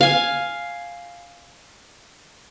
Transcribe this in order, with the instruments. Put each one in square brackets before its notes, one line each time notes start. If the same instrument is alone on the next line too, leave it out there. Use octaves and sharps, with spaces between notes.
[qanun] F5 G#5